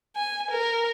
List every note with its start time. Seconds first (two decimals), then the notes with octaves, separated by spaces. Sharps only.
0.16 G#5
0.51 A#4